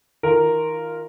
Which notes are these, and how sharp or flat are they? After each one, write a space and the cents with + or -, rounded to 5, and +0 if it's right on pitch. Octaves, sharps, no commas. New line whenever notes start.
D#3 +40 F4 +0 A#4 +0